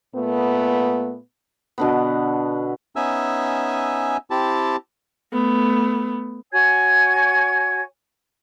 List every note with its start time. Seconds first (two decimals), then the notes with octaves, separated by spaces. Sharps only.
0.15 A#2 A3 B3
1.78 B2 D3 B3
2.96 B3 C#4 D#4 E5 G#5 E6
4.30 C4 E4 G4 A5
5.33 A3 B3
6.51 F#4 C#5 G#5 G#6